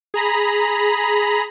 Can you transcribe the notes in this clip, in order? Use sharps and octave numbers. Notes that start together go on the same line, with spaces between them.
G#4 A#5 B5